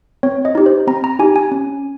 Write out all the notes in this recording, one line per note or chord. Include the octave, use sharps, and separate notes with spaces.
C4 C#5
D#5
D#4 G4
C5
C4 A#5
A#5
D#4 G4 G#5
G#5
C#4